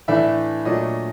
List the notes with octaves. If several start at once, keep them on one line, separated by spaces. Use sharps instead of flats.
A2 E3 A3 D4 E5
A#2 F#3 A3 D4 D#5